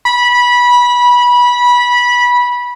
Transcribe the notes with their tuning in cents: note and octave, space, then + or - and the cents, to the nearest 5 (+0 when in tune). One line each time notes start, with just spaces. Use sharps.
B5 -20